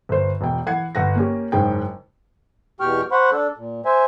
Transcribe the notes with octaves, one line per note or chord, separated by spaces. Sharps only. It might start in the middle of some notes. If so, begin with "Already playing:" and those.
G1 C5
E1 B2 G5
E3 F#5 G#6 C7
G1 F#5 A#6
A#3 C#4 G4
F#1 G#2 C#4 G#4 G5
E2 B2 G4 G5 C#6 F6
C5 F#5 B5 C#6
D4 A4
A#2
C5 E5 G#5